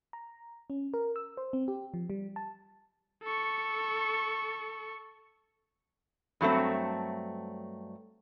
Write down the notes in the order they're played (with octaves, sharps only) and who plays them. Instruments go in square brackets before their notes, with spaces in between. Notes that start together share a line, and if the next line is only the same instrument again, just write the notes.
[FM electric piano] A#5
C#4
A#4
E6
C5
C4
G4
F3
G3
A5
[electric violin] A4 C#6
[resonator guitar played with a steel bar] G2 F#3 A3 C4